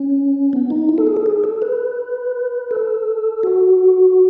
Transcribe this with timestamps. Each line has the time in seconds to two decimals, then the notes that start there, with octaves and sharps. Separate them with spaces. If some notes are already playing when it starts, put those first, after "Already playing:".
Already playing: C#4
0.53 B3
0.70 D#4
0.89 E4
0.98 A4
1.07 G#4
1.17 A4
1.26 G#4
1.44 A4
1.62 B4
2.71 A4
3.43 F#4